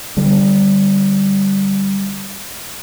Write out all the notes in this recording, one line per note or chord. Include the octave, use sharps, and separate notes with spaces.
D3 G3